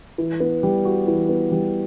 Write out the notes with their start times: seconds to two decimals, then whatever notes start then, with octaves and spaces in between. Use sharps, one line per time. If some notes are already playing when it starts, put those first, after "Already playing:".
0.18 E3
0.40 B3
0.63 G3
0.85 F#4
1.07 E3
1.29 B3
1.52 G3